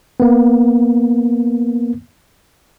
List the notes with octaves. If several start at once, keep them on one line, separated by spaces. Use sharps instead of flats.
A#3 B3